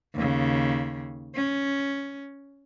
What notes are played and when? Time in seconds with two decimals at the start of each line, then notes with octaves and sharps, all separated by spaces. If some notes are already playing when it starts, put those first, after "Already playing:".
0.15 D#2 C#3
1.35 C#4